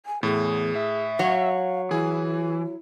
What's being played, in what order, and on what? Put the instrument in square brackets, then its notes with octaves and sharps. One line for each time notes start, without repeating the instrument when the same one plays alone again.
[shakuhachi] G#5
[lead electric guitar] E2 [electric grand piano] A2 [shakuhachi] G#4
[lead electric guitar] E5
[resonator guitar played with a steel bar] F#3 C#5 [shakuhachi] F5
[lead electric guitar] E3 [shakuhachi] E4 [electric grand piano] G#4 G#5